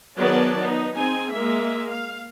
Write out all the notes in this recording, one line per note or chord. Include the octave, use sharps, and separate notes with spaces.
D#3 F#3 B3 G#4 D5 A5
B3 D#4
C4 D#4 G#4 G#5
G#3 A#3 E5
F5